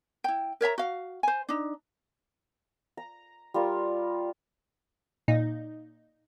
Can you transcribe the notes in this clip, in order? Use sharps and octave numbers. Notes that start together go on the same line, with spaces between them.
E4 G5
A#4 C#5 E5 A#5
F#4 F5
C5 G#5
D4 D#4
A#5
G3 F4 A#4
A#2 D#4